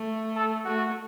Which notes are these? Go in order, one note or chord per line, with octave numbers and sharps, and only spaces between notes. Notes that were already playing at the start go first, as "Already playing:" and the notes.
Already playing: A3
A4
A3 F#4